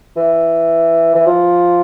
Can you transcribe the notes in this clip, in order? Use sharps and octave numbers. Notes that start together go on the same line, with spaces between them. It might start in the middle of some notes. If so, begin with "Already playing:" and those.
E3
E3
F3